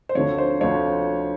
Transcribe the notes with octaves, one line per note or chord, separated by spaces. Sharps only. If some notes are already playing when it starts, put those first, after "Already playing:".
C5
D2 D3 F3 C#5
C5
D2 D3 F3 C#5